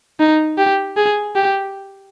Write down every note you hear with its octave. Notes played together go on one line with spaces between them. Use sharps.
D#4
G4
G#4
G4